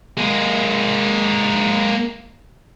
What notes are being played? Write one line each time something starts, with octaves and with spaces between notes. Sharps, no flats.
G#3 A#3